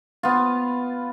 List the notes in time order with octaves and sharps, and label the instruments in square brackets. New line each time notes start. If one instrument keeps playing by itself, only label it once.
[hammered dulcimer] B3 F4